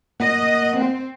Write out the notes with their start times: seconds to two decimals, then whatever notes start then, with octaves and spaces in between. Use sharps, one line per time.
0.20 A#3 D#5 F#5
0.77 C4